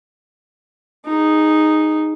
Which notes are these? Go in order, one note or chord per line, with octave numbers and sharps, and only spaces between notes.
D#4 G#4